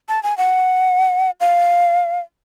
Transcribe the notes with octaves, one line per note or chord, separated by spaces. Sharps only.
A5
G#5
F#5
F5